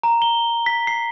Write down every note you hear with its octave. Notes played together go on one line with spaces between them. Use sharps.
A#5
G7
B6
C7